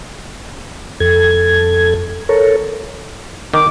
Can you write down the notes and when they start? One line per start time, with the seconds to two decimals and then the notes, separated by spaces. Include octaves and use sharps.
1.00 F2 A4 G#6
2.29 A4 A#4 C#5
3.54 D#3 D6